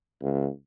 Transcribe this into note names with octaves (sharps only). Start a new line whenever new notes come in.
C#2